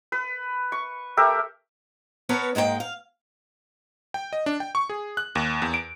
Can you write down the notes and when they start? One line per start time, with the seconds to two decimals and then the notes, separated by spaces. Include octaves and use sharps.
0.12 B4
0.72 C#6
1.17 A3 G4 A#4 E5
2.29 B3 A#4 B4 C#5 A5
2.55 G#2 G#3 A#3 B4 G5
2.80 F5
4.14 G5
4.33 D#5
4.46 D4
4.60 G5
4.75 C#6
4.90 G#4
5.17 F#6
5.35 D#2
5.62 E2
5.74 D7